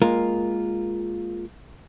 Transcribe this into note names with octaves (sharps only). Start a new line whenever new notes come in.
G#3 A#3 F4 A#4